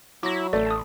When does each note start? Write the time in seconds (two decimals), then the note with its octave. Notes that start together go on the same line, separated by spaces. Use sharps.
0.23 F#3 E4 D6 A#6
0.53 A1 A3 D5
0.66 A5 D#6